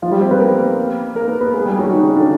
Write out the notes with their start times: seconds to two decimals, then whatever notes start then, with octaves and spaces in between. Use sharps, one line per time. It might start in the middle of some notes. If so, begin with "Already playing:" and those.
0.02 F3 F4
0.12 G3 G4
0.21 C4 C5
0.31 B3 B4
0.40 A#3 A#4
1.15 A#3 A#4
1.28 B3 B4
1.40 B3 B4
1.54 G#3 G#4
1.66 G3 G4
1.79 F#3 F#4
1.91 D#3 D#4
2.03 C#3 C#4
2.16 D3 D4